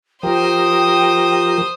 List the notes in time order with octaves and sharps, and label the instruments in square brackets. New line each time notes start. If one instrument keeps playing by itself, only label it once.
[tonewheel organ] F3 G4 A#4 [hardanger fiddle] C5 D#6 [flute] G5